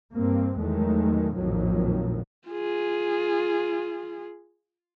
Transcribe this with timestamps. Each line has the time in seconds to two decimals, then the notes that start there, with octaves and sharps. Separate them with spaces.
0.14 G2 A#3 C4
0.60 E2 D#3 F#3 G#3 A3
1.37 A#1 F2 A2 D#3 F3 F#3
2.48 F4 G#4